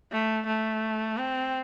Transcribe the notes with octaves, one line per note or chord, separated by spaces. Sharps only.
A3
A3
C4